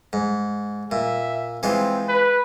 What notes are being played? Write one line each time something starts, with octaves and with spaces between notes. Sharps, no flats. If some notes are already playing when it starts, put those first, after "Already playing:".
G#2
A#2 E5
E3 G#3 C4 F4
B4